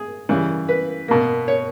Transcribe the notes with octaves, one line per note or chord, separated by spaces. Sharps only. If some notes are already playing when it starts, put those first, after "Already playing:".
Already playing: G#4
C#3 E3 G3
B4
B2 A#3
C#5